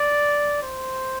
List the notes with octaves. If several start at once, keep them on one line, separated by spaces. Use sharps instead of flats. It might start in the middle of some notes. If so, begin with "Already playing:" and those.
Already playing: D5
C5